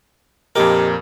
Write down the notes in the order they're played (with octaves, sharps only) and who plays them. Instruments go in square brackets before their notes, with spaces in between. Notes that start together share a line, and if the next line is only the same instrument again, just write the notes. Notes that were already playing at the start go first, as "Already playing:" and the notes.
[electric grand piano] F2 A#2 A#4 [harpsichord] D#4 G4